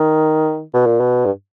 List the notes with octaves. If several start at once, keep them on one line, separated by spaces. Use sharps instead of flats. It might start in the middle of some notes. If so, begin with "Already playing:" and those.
Already playing: D#3
B2
A#2
B2
G2